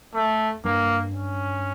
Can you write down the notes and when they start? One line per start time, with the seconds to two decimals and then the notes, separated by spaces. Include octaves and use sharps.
0.14 A3
0.65 G2 A#3
1.14 C#4